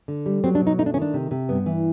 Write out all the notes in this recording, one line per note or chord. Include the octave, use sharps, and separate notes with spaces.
D3
G3
F#3 C4
D4
B2
D#4
A3 D#4
D4
D#3 C#4
D4
C3
C3
G2 B3
E3